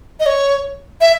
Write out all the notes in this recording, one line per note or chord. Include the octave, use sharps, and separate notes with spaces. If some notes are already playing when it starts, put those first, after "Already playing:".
D#5
C#5
E5